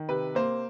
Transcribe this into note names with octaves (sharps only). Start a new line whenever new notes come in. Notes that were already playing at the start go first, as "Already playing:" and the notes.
Already playing: D#3
C3 B4
A#3 C5